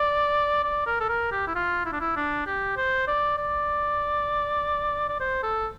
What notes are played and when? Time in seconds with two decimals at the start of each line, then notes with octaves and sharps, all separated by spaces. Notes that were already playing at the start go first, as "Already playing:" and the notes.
Already playing: D5
0.64 D5
0.86 A#4
1.00 A4
1.09 A#4
1.32 G4
1.47 E4
1.55 F4
1.85 E4
1.92 D4
2.00 E4
2.16 D4
2.47 G4
2.77 C5
3.07 D5
3.37 D5
5.09 D5
5.20 C5
5.43 A4